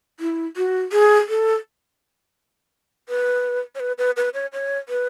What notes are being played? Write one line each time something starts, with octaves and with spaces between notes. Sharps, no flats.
E4
F#4
G#4
A4
B4
C#5
B4
B4
B4
C#5
C#5
B4